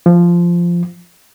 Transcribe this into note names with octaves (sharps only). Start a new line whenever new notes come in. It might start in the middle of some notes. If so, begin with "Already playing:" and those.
F3